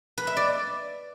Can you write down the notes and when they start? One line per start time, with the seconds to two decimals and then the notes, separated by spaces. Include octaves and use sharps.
0.18 B4
0.27 E5
0.37 D5